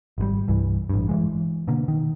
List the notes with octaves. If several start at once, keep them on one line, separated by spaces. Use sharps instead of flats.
G#1 C3 G3
C2 G2 E3
A1 G2
E3 F3 G#3
B2 D3 A#3
D#3